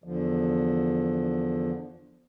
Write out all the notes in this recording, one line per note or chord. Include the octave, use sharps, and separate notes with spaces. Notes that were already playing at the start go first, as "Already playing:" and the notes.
E2 D3 F3